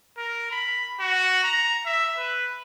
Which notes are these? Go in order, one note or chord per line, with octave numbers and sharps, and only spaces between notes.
A#4
B5
F#4
A#5
E5
B4